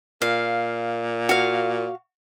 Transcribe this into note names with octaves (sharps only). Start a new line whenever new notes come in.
A#2 F5
F#4 F5